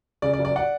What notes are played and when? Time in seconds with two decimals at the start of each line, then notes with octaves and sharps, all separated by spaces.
0.22 C#3 D5
0.33 D5
0.39 F#1
0.45 D5
0.56 D5 F#5